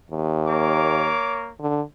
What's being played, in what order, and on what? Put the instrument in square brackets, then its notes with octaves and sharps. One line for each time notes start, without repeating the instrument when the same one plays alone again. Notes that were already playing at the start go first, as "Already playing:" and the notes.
[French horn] D#2
[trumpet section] A#3 C#5 D6
[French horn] D3